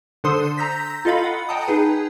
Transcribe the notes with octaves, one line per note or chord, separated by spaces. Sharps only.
D3 D4 A4 C5 C6 D#6
A#5 E6 G6 A#6 B6
F4 A4 D#5 F5 B5
F#5
D#5 F#5 G5 A5 A#5 D#6
D#4 G#4 B4